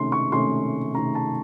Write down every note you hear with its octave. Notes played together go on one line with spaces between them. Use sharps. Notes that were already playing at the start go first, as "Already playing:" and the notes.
Already playing: C3 D#3 A3 C#4 C6
C#6
C3 D#3 A3 C#4 C6
C3 D#3 A3 C#4 A#5
A5